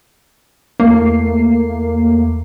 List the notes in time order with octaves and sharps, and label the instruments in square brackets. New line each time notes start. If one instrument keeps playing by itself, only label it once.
[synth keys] E2 A3 C7 [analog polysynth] A#3